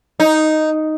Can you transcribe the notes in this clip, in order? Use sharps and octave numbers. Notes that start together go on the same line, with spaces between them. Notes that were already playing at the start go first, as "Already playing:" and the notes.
D#4